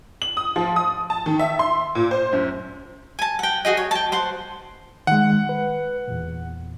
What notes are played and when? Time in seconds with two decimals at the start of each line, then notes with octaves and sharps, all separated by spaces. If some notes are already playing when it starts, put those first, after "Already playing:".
0.22 F#7
0.37 D#6
0.56 F3
0.76 D#6
1.10 A5
1.26 D#3
1.39 E5
1.59 C6
1.95 A#2
2.11 C5
2.33 F#2
3.19 G#5 A5
3.39 F#5 G5
3.65 F#4 G#4 D#5
3.77 C#5
3.91 G5 A5
4.12 C5 F#5 C6
5.07 D#3 G#3 F#5
5.49 B4
6.08 E2 A#2